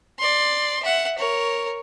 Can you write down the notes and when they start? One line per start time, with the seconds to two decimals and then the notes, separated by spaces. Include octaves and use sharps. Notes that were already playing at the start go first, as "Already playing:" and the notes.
0.19 D5 C6
0.83 E5 F#5
1.18 A#4 C#5